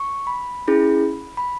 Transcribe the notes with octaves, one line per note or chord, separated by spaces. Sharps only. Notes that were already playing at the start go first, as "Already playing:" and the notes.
Already playing: C#6
B5
C#4 E4 G#4
B5